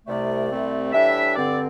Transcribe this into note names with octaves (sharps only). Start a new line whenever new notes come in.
C2 C3 A3 D5
C2 C3 A3 C4
A2 E3 G3 D4 E5
G2 D3 C4 D5